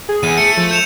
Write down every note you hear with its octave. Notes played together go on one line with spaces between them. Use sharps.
G#4
E2 D#7
A3 C#7
F3
G6 E7 F7